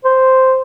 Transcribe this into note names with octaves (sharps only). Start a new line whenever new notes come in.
C5